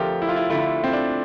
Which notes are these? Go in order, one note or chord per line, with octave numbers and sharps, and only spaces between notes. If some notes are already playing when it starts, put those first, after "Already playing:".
Already playing: F2 D3 F3 A3 G4 A#4
E4
F4
E4
F2 D3 F3 A3 E4
C4
D4